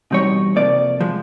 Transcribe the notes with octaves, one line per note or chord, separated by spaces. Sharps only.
E2 B2 G3 C4 D#4 C#5
F2 C3 F3 A#3 D5
F3 G#3